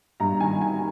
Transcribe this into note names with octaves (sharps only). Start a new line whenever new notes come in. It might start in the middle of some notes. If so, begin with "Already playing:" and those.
G2 A#5
D#3 G#5
D#3 G#5